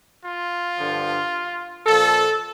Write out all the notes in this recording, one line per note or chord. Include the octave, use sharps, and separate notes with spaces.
F4
G2 D3 F3
A#2 F3 A4